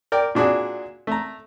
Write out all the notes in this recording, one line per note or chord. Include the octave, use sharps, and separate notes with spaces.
A#4 D5 G5
A#2 D4 F#4 G#4
A3 A#5